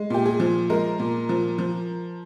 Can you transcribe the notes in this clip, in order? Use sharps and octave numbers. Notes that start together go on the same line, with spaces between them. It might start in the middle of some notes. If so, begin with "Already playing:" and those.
Already playing: G#3
A#2 G4
G#4
F3
G#3 A#4
A#2
F3
F3